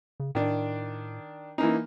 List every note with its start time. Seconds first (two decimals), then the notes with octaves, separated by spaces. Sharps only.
0.20 C#3
0.35 A2 D#3 D4
1.58 E3 A#3 C#4 D#4